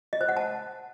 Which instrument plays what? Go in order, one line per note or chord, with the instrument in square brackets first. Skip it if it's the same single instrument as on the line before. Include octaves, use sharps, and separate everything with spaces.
[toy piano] D#5
C5
F#5
A5